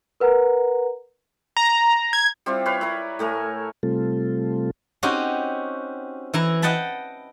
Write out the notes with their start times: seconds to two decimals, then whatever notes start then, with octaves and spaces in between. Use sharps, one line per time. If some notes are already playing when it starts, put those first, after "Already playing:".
0.20 A#4 B4 F#5 A#5
1.57 A#5
2.13 G#6
2.46 G3 C4 E4 F4
2.66 B4 C#5 F5
2.81 E4 A#4 B4
3.19 A2 A3 A#4 G#5
3.83 C3 G3 A3 C4 F4 A4
5.03 C4 C#4 D#4 F#4 G4
6.34 E3 E4 A#5
6.62 D#5 F#5 G5 A5 B5